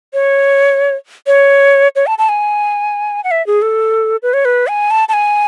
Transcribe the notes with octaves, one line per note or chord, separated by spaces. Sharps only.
C#5
C#5
C#5
A5
A5
G#5
F#5
E5
G#4
A4
B4
C#5
B4
G#5
A5
A5
G#5